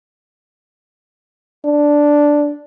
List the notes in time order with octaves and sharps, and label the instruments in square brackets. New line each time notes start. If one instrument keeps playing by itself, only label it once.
[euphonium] D4